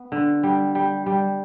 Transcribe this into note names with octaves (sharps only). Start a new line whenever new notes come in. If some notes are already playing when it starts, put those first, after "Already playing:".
Already playing: B3
D3
G3
G3
G3